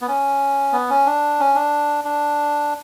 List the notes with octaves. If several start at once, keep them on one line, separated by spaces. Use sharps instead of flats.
B3
C#4
B3
C#4
D4
C#4
D4
D4